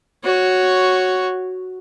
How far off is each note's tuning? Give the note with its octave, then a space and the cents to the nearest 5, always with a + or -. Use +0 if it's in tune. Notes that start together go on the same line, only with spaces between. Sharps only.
F#4 +0 C#5 +0